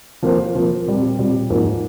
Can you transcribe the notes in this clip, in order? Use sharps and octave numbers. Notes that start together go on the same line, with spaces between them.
F3 A#3 F4 C5
F3 A#3 F4 C5
A#2 G3 C4
A#2 G3 C4
G#2 F3 A#3